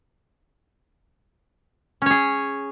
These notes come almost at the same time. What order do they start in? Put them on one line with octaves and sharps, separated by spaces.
C#4 C#5 G#4